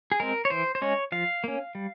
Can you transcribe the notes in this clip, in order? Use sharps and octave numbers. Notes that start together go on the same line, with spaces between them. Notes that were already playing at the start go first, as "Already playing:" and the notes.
G#4
G#3 C4 A#4
C#5
E3 C5
C5
G#3 C#4 C#5
F3 F5
A#3 C#4
G3